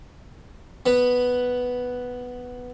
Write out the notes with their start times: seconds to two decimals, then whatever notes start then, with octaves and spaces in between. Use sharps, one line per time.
0.86 B3 B4